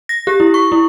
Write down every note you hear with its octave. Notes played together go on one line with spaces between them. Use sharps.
A#6
G4
E4
C#6
E4